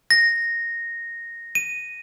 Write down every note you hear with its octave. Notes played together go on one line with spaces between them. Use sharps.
A#6
D#7